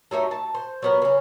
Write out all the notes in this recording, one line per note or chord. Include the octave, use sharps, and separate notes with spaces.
F#3 A3 D#4 E5
A5
C5
F#3 B3 A#4
C#3 C#4